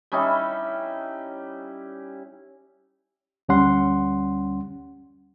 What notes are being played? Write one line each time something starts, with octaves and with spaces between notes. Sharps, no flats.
G3 C#4 D#4 E4
D2 G3 C#4 F#5 C6